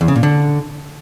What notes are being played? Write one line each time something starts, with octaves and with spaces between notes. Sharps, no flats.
E2
C#3
A#2
D3